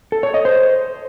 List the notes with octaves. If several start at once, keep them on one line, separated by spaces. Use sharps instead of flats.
A4
C#5
D#5
C5